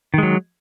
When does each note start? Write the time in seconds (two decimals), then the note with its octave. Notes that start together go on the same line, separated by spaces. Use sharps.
0.14 D#3
0.18 G#3
0.23 F#3